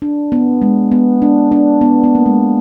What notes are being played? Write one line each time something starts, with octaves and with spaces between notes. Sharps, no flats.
D4
B3
G#3
B3
D4
D4
B3
B3
A#3
G#3